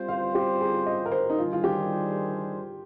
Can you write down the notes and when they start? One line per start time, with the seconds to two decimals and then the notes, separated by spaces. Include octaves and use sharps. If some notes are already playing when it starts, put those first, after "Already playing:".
Already playing: G3 C4 F4 C5
0.08 F5
0.35 G4
0.61 G#4
0.86 D#5
1.06 A#4
1.12 C5
1.30 D#4
1.37 D#3 G3 D4 F4 G#4 C5
1.53 F4
1.64 G4